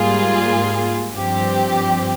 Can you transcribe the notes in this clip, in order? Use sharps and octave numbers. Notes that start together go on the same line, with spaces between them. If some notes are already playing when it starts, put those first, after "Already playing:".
Already playing: G#2 G3 A#3 F4 G#4
G2 F3 C4 G4